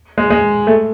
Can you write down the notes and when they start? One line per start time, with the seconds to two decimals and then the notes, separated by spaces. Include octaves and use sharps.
0.18 G#3
0.30 G#3
0.67 A3